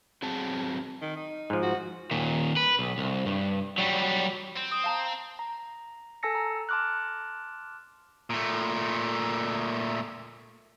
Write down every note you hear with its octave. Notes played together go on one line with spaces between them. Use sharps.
F#3 C4 G#4 A5
D#3
D#4
G#2 F3
F#4
D#2 A#2
B4
B1
C2
G2
F#3 G3
C4
D#6
F5 A5 A#5
A#5
A4 G#5 A5 E6 A#6 C#7
A#5
A5 C6 D6 F6 F#6
A#2 A3